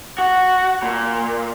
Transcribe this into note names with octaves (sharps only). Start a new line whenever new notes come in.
F#4
A#2